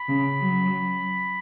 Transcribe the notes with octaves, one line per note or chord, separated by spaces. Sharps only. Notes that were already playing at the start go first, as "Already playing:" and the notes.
Already playing: B5
C#3
F#3